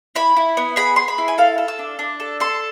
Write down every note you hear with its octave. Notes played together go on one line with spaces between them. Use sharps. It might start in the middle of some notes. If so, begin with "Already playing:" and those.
E4 B5
E4
B3
G#4 B5
G#4 C6
B5
E4
G#5
A4 F5
A4
E6
D4
D4
A4
A4 C6